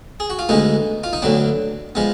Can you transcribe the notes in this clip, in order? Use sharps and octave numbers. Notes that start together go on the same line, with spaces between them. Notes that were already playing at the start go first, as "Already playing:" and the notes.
G#4
F#4
F4
D2 D3 G#3 B3 D#4
F4
D#4
D2 D3 F#3 B3 D4
F3 G#3 B3